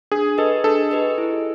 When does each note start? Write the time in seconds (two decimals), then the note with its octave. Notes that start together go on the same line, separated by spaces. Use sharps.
0.12 D4 G#4
0.38 G4 A4 B4 D#5
0.64 D4 A4
0.91 G4 B4 D#5
1.18 E4